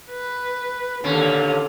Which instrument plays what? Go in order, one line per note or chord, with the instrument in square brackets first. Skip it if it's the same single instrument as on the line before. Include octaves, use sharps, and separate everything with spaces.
[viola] B4
[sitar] D#2 A#2 C#4 [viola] D3